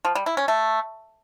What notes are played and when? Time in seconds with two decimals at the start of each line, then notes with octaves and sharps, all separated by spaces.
0.05 F3
0.15 G3
0.26 E4
0.37 C#4
0.48 A3